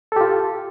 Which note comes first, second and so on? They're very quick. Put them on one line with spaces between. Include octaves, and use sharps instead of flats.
A4 G4 F4